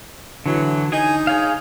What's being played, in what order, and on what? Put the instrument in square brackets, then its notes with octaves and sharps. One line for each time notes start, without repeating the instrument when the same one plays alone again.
[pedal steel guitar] D3 [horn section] E3 F#3
[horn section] D#4 [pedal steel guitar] G#4 G#5
[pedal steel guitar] G#4 C#5 F5